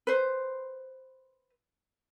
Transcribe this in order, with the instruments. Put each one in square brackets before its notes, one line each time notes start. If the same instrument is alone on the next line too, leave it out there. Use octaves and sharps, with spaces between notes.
[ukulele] B4 C5